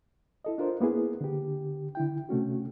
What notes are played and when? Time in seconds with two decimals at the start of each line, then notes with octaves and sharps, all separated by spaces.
0.45 E4 A4 D#5
0.58 D4 F4 A#4 C5
0.81 A#3 B3 E4 G#4
1.21 D3 G4
1.95 D3 E4 G5
2.29 C3 A3 C#4 F#4